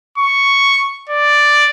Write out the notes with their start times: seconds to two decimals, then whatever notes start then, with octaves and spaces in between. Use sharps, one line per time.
0.18 C#6
1.09 D5